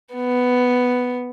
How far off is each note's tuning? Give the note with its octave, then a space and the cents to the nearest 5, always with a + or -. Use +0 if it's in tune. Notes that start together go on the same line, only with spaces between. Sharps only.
B3 +5